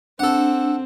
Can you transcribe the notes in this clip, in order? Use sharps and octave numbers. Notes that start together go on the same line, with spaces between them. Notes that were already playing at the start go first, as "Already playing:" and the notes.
C4 D4 A4 F#5